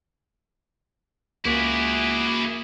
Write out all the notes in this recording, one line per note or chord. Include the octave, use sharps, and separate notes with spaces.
C#2 A#3 E4 F#4 G#4 D6